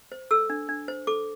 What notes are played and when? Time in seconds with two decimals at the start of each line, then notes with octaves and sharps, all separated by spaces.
0.12 C5
0.31 A4 E6
0.50 D4
0.69 D4
0.88 C5
1.07 A4 D6